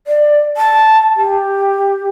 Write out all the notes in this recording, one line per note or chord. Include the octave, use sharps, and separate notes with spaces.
D5
A5
G4